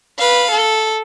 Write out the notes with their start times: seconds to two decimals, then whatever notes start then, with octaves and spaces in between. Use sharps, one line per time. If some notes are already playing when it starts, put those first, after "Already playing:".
0.19 B4 F5
0.51 A4